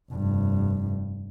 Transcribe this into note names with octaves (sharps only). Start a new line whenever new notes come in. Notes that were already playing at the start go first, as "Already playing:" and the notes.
F1 G2